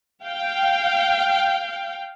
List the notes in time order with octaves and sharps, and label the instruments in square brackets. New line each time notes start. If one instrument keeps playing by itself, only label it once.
[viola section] F5 G5